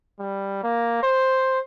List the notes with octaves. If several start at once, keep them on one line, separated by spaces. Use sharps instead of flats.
G3
A#3
C5